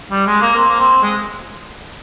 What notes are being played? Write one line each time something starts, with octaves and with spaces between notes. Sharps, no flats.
G3
G#3
A#3
C4
A#3
C4
G#3